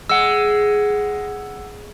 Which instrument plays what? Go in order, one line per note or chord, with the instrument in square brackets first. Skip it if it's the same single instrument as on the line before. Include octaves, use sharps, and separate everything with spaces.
[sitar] G#3 [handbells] F#5 E6